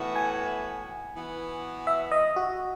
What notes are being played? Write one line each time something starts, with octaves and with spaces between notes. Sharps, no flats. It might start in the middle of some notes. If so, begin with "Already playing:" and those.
Already playing: A2 E3 B3 F#4
G#5
E3 B3 F#4
E5
D#5
F#4